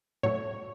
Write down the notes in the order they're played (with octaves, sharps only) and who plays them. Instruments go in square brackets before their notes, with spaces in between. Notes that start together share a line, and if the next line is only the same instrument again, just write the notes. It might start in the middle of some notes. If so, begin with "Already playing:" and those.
[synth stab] A2 F#3 A3 C#5